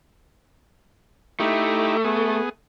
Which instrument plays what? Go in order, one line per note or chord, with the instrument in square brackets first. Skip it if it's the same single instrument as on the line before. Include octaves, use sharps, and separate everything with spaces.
[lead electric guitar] A3 [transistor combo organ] D#4 E4 G4
[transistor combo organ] B3 G#4